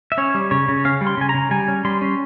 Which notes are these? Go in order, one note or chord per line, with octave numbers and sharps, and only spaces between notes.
E5
C#4 C#5
G3
C#3 C#5
C#3
C#4 F5
G3
C6
C#3 G#5
A#5
C#3
G3 G#5
C#4
G3 C6
C#4